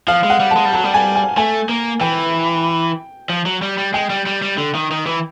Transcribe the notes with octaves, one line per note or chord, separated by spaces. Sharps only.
F3 F5
G#3
F#5
G3
A5
G#3
G3
F#3 A5
G3
G#5
G#5
A3 G#5
A#3
E3 G5
F3
F#3
G3
G3
G#3 G5
G3
G3
G3
D3
D#3
D#3
E3